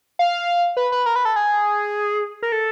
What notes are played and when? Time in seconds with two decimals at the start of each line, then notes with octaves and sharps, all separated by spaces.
0.19 F5
0.77 B4
0.92 B4
1.06 A#4
1.16 B4
1.25 A4
1.36 G#4
2.43 A#4
2.52 A4